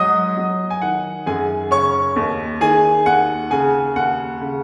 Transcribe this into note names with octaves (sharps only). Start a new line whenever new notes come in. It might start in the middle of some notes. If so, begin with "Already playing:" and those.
Already playing: G#2 F#3 D#5 D#6
F#3
G#5
D#3 F#5
F#2 G#4 G#5
C#3 C#5 C#6
D#2
D#3 G#4 G#5
D#2 F#5
C#3 G#4 G#5
D#2 F#5
C#3